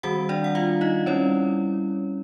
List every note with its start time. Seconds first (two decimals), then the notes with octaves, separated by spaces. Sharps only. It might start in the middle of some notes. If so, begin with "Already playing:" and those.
0.03 D#3 G3 C4 F#4 F#5
0.29 D4 D5
0.44 F#5
0.55 F4 F5
0.81 D#4 D#5
1.06 G3 C4 C#4 E4 C#5